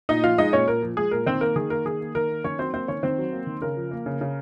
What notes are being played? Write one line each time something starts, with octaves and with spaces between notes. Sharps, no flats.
A#2 D#4 D#5
F3 F4 F5
G#3 D#4 D#5
A#2 C#4 C#5
A#2 A#4
F3
G#3 G#4
A#2 A#4
D#3 C4 C5
A#3 A#4
D#3 G#4
A#3 A#4
D#3 G#4
A#3
D#3 A#4
A#3
D#3 C#4 C#5
F#3 C4 C5
A#3 C4 C5
D#3 C#4 C#5
D#3 C4 C5
F#3
A#3
D#3
C#3 A#4
F3
A#3
C#3
C#3